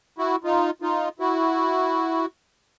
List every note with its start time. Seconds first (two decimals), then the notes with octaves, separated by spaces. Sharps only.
0.18 E4 F#4
0.44 D#4 F4
0.82 D#4 F4
1.19 E4 F#4